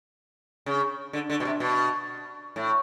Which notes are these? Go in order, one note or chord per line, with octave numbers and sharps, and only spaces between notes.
C#3
D3
D3
B2
C3
B2
A2